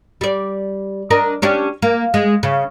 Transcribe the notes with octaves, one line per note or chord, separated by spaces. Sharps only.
G3 D5
D4 A#4 D#5
C#4 D4 G4
A#3
G#3
C#3